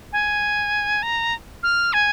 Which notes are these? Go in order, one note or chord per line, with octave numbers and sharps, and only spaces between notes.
G#5
A#5
F6
G#5